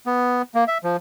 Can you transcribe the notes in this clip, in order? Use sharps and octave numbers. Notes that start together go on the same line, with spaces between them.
B3
A#3
E5
F3